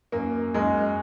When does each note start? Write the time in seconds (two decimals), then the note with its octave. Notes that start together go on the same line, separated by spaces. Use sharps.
0.12 F#2 A#3
0.54 F#2 G#3